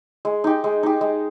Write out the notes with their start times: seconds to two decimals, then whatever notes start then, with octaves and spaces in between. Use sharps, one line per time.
0.25 G#3
0.44 D#4 G4
0.64 G#3
0.83 D#4 G4
1.01 G#3